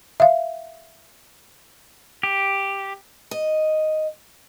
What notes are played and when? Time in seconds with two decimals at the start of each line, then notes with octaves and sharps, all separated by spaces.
0.20 E5 F5
2.23 G4
3.31 D#5